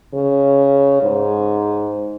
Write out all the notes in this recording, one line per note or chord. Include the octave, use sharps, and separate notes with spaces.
C#3
G#2